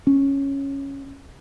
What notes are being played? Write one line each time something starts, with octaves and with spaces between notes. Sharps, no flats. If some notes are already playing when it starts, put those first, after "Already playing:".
C#4